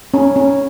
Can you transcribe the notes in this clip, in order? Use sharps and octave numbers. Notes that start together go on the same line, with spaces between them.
C#4
C#4